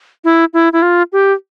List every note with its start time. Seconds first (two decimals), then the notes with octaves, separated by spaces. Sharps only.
0.24 E4
0.54 E4
0.73 E4
0.82 F4
1.12 G4